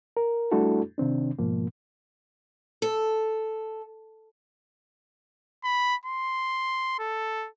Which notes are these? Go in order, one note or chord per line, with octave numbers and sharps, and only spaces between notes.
A#4
G3 A3 D4 E4 F#4 A4
C3 D#3 C4 D4
G#2 B2 F3 A#3
A4
B5
C6
A4